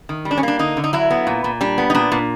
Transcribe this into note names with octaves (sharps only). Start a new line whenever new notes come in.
D#3
G3
D4
C#4
A#3 D4
D3 D#4
D3
D#4
F#3 E4
B3
A#2
A#2
G3 D4
B3
D#4
A#2 D4
A#2